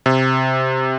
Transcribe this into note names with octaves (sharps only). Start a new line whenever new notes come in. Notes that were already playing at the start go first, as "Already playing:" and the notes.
C3